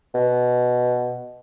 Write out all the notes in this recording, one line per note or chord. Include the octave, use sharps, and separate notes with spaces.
B2